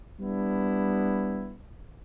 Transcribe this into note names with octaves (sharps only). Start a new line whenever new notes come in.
G3 B3 D4 E4